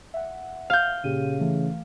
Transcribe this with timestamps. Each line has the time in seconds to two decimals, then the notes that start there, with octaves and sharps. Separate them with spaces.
0.14 E5 F#5
0.70 F5 G6
1.04 A#2 C#3 G4 D#7
1.40 E3 A3